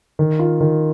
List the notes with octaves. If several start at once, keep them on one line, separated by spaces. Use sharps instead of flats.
D#3
F4
D#3